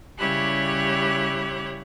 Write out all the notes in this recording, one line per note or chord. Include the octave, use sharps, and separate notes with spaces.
C#3 G3 E4 G4 C#5 F#6